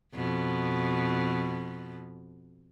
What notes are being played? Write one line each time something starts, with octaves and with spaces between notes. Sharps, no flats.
F2 B2